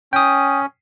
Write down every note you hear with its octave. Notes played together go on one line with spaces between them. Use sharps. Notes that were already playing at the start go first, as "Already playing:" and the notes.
C#4 G5 D#6